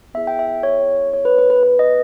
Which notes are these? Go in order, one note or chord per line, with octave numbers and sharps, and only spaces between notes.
B3 E4 G#4 E5
G5
E5
C#5
C#5
B4
B4
B4
B4
D#5